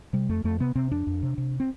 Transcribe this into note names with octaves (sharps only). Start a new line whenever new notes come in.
C3 G3
F2 A3
F2 A3
C3 B3
C3 C4
F2 D4
F2
C3
C3
C4